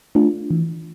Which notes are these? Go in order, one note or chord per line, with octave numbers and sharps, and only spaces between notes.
A3 D4 F4
E3